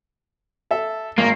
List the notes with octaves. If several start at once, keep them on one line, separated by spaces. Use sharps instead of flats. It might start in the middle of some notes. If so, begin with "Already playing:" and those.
A4 E5
G#1 A#3